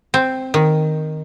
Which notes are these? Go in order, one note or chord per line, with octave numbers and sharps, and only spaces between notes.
C4
D#3